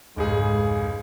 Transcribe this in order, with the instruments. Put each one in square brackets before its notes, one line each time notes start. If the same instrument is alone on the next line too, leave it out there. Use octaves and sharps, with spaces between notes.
[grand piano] F1 C#2 G#4 [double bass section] G#2